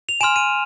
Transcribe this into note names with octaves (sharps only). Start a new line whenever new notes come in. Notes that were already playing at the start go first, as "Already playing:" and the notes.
F7
G#5 C6 F6 E7
D#7